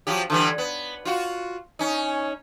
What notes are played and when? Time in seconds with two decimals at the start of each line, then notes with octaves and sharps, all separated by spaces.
0.07 F3 F#3 G4
0.30 D3 E3 G3
0.58 B3
1.05 F4 F#4
1.79 C#4 D#4